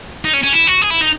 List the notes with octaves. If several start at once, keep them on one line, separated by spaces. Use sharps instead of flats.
D#4
C#4
C#4
E4
F#4
G#4
E4
D#4